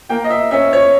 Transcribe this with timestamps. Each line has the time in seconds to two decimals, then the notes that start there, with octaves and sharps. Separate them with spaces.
0.09 A#3 G5
0.24 D#5
0.30 E5
0.51 C#4 E5
0.73 C#5